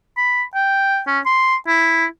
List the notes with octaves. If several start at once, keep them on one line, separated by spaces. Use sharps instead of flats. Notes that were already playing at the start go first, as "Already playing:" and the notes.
B5
G5
C#4
C6
E4